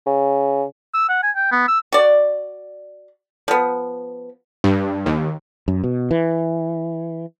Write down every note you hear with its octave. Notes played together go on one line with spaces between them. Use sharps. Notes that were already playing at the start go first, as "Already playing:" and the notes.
C#3
E6
F#5
G#5
G5
B3
E6
F#4 D5
F3 B3
G2
D#2
F#2
B2
E3